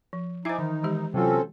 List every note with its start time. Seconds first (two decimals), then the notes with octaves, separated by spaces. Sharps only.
0.13 F3
0.45 D#4 E4 C5 E5 G#5 D6
0.59 D#3 E3
0.83 E3 G#3 G4
1.14 C3 F#3 C4 C#4 F4 A4